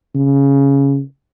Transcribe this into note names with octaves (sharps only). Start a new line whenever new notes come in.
C#3